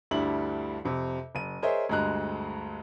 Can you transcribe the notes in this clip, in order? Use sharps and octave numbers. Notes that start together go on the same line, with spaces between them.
D2 G2 G3 D4 E4 F#7
F2 C3
F#1 D#7
G#4 A#4 C5 C#5 D#5 E5
D2 G2 G#3 A#5 F#6